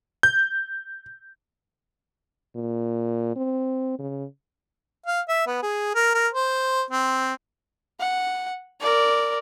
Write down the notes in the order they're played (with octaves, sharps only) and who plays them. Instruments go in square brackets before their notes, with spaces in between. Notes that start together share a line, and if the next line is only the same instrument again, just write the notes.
[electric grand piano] G6
[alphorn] A#2
C4
C#3
[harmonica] F5
E5
B3
G#4
A#4
A#4
C5
C4
[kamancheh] F#5
A#4 D5